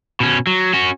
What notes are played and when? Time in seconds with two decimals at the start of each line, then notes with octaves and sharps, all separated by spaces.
0.20 B2 C#4
0.47 F#3
0.73 C#4 F#4